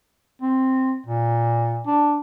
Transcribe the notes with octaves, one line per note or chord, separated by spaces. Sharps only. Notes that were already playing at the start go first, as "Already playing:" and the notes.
C4
A#2
D4